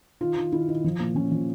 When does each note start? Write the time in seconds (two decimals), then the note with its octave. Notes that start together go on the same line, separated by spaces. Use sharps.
0.21 D#3 F4
0.37 D#3
0.52 D#3 E4
0.68 D#3
0.84 F3
1.00 A#2
1.15 F3 C#4
1.32 F3